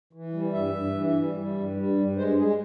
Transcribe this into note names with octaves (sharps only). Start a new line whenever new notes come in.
E3
G3
G2 E5
G2
E3
G3
G3
G2
G3
G2
G#3 C5
G#3 G#4